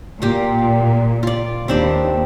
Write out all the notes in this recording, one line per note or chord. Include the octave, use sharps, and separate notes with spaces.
A#2 A#3 G4
F4 D5
D#2 C4 D4 G4